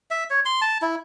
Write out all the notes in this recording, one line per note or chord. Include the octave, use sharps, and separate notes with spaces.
E5
C#5
C6
A5
E4